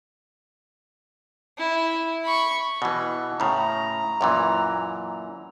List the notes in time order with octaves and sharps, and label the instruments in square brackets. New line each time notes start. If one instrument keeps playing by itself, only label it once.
[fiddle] E4
B5 C#6
[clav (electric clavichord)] B2 E3
[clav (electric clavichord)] A2 C#3 [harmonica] A#5
[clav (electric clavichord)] F#2 A#2 E3